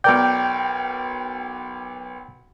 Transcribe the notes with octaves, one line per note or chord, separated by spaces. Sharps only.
B1 A#4 D5 G5 G6